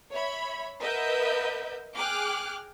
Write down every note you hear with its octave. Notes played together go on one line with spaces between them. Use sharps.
C#5 E5 B5
A#4 B4 D#5 E5 F#5 G6
G#4 G5 D6 F6 F#6